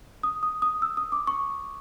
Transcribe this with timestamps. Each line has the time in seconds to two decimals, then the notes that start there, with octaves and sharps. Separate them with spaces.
0.23 D#6
0.43 D#6
0.62 D#6
0.82 E6
0.97 D#6
1.12 D6
1.27 C#6